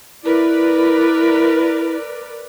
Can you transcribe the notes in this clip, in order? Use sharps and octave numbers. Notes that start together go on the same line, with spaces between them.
E4 A#4 B4 D5